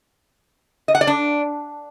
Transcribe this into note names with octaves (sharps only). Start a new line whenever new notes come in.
D#5
F#5
D5
D4